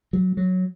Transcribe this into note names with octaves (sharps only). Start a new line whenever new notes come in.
F#3
F#3